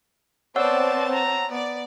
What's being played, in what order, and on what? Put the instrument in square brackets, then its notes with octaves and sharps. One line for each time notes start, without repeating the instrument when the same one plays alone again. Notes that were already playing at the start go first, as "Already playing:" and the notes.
[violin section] B3 C4 A5 [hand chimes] C#5 F#5 E6 [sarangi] D5
[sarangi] A#5
[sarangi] B3 [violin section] D5